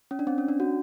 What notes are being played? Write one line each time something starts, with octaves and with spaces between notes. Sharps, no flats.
C#4
D4
C4
C#4
D4
F#4